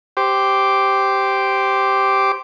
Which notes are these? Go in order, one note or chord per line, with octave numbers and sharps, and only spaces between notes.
G4 C5 D6